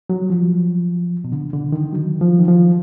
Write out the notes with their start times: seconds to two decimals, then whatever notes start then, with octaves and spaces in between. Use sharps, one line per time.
0.10 F#3
0.30 F3
1.24 B2
1.32 D3
1.53 D3
1.72 D#3
1.93 F#3
2.21 F3
2.39 D#3
2.48 F3